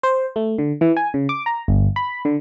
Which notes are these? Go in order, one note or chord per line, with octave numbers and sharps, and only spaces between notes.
C5
A3
D3
E3
G#5
C#3
D6
A#5
G1
B5
D3